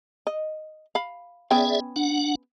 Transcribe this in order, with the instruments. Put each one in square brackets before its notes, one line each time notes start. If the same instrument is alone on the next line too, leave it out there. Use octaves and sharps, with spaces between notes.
[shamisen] D#5
F5 B5
[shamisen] B3 C#4 G5 [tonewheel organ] G#4 D5 E5
[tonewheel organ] D4 F#5